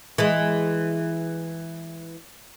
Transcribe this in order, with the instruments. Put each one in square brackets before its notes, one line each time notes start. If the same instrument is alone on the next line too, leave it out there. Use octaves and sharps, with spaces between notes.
[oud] E3 G#3